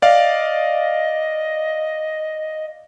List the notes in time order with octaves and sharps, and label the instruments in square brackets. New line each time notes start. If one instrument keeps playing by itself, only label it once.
[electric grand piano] D5 F5 [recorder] D#5